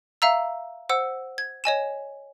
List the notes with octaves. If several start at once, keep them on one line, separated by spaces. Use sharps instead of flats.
E5 F5 A#5 E6
C5 F#5 E6
G#6
C#5 D#5 G#5 E7